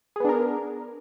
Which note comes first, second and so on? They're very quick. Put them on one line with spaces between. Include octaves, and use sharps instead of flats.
G#4 B3 D4 A#4